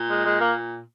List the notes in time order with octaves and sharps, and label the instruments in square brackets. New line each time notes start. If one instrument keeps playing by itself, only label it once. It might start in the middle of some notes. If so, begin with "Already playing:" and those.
Already playing: [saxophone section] A#2
G#3
G#3
A#3